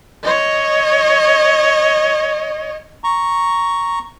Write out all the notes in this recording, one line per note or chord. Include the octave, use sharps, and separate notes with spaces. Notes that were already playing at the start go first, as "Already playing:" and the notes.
C#5 D#5
A#5 C#6